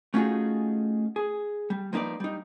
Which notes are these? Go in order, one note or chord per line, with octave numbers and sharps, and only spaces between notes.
A3 C#4 D#4 F4 F#4 G#4
G#4
G3
F3 A#3 D#4 B4 D5
G3 D#4